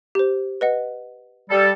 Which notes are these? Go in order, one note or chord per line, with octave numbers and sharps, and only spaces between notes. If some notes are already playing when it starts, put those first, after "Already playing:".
G4 C5
B4 D#5 F#5
G3 A4